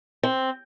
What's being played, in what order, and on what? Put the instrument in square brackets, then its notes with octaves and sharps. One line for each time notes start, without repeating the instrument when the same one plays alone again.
[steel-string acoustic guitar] C4